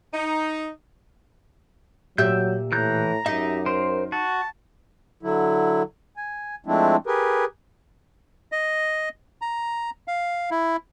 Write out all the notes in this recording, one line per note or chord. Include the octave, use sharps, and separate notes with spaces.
D#4
A#2 F#3 G4 E5 G6
A2 E3 A#5 F#6 G6
F#2 D#4 G4 E5
A#4 C5 C6
F#4 A5
D3 F#3 E4
G#5
F3 G#3 A3 C4 D4 E4
G4 G#4 A#4 B4
D#5
A#5
F5
E4